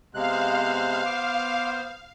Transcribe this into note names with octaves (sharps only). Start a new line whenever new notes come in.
C3 G#3 B3 C5 F5 F#6
D6